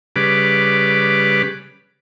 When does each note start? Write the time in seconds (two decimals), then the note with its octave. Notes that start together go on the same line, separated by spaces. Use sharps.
0.16 C#3 G3 B4 D6